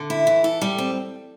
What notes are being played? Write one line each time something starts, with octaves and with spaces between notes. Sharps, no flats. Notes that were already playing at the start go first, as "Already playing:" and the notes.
Already playing: D3
E4
E3
A4
G3
C4